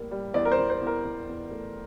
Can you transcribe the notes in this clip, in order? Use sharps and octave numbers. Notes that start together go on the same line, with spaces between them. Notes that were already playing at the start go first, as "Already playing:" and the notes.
Already playing: A2 G3 A#3
G3
E2 D5
A#4
C5
E2
C5
E2
A#4
E2
E2
A3